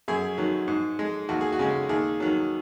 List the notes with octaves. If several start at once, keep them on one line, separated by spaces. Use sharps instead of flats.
F#2 G#4
D#3 F#3
G#2
G#3
D#2 F#4
G#4
F#4
C#3 G#3
D#2 G#4
D#3 F#3